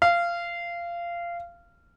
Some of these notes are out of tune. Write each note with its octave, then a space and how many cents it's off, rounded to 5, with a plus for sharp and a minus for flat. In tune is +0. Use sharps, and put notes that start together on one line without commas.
F5 -20